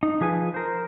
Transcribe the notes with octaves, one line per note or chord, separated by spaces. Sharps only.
D#4
F3 G#4 B4 G#5
A#4 C5